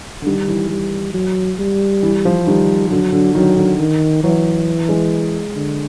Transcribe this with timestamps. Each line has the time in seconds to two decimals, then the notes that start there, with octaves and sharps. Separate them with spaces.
0.22 D3
0.26 D#3 G3
0.48 E3
0.70 G3
1.14 F#3
1.59 G3
2.03 E3
2.25 F3
2.46 D#3 G3
2.91 D3 F#3
3.12 D3
3.35 D#3 F#3
3.56 D3
3.80 D#3
4.23 E3 F#3
4.89 G#3
5.56 D3